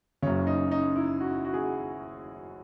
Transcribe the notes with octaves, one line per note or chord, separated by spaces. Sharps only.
F#1 F#2 C#3 C#4
D#4
D#4
E4
F#4
F#4
G#4
F#4